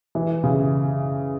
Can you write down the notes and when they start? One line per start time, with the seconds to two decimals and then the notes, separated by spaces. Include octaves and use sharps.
0.15 E3
0.44 C#3